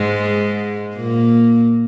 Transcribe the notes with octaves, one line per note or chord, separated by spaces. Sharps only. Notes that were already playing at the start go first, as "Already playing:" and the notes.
Already playing: G#2 G#3
A#2 A#3